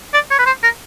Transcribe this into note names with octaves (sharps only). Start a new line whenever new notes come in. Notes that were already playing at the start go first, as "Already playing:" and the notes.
D5
C#5
B4
C5
A#4